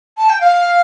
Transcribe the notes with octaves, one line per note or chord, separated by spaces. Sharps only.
A5
G5
F5